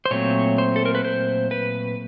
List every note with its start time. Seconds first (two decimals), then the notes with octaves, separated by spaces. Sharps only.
0.06 C5
0.11 A#2 F#3 A3 C4 C#5
0.58 C5
0.76 A4
0.86 A#4
0.95 B4
1.04 C5
1.51 B4